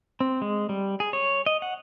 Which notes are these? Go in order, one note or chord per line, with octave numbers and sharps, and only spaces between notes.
C4
G#3
G3
G#4
C#5
D#5
F#5